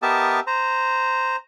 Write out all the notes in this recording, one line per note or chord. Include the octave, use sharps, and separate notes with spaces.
B3 G4 A#4 D#5 E5 A5
C5 A#5